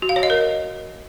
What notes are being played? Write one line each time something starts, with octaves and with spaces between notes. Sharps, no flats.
F#4
F5
C#5
D#5
A#4